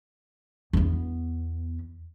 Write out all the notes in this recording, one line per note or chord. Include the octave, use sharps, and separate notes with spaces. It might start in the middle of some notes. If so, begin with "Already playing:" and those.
E2 B3